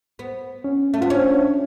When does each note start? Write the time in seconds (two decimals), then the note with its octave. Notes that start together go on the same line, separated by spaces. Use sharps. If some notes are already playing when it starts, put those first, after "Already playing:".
0.19 B3
0.64 C#4
0.94 A3
1.01 B3 F4
1.10 C#4 D4